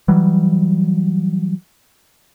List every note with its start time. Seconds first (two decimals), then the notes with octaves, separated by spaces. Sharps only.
0.08 E3 F#3 G3